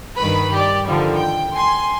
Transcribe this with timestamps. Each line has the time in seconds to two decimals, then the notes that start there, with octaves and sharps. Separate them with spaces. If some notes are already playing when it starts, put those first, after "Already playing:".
0.16 G2 D#3 B4 B5
0.52 G4 D5
0.87 D3 D#3 F3 G3
1.16 G5
1.54 G#5 C6